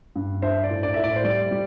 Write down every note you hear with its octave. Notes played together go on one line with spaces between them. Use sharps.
G2
D4 C5 E5
D5
A2
D5
A2 E5
D5
C5
G3 D5
G3